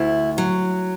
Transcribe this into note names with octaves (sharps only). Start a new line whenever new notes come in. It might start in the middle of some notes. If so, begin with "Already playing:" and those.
Already playing: D2 E4
F#3